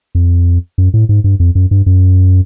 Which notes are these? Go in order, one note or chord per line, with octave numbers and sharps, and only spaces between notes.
F2
F#2
A2
G#2
G2
F2
F#2
G2
F#2